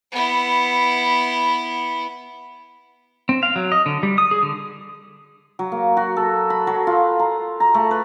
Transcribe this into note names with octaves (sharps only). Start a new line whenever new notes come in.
B3 E4
C4
F5
F#3
D#5
D3
G3
D#6
G#4
D3
F#3
A#3
F#4
A4
B5
F#3
F4
A#5
A#5
A3
B4